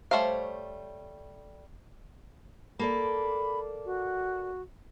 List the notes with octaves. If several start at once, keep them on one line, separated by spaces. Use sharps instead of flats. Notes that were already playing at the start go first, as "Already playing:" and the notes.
G3 A3 C5 C#5 F5
A#3 A4 D5 B5
F#4